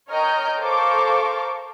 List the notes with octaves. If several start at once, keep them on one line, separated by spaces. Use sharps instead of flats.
A#4 C#5 D#5 G5 F6 G6
A4 A#4 C5 F5 C#6 D6